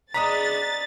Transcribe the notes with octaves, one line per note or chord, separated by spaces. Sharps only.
G#3 B3 D4 A#5 D#6 A6 B6